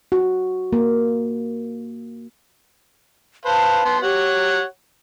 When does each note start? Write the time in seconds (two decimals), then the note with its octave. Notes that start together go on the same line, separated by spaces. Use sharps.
0.12 F#4
0.73 A#3
3.45 B4 C5 F5 A5
3.85 B3 C6
4.02 G4 C#5 F#5